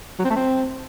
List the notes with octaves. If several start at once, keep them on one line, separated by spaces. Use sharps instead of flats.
F#3
C4
A3
C4